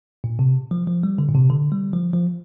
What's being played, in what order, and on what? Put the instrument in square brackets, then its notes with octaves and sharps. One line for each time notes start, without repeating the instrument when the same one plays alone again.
[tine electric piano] A#2
C3
F3
F3
G3
D3
A#2
C3
D3
G3
F3
F3